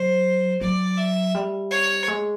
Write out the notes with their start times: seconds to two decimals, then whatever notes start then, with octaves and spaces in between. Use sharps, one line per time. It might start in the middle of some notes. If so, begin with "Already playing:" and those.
Already playing: F#3 C5
0.61 F#3 D5
0.98 E5
1.35 G3
1.71 C#5
2.08 G#3